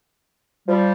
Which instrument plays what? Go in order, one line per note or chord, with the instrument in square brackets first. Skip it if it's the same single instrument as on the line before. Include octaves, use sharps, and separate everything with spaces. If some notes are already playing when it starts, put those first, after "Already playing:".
[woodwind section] F3 G3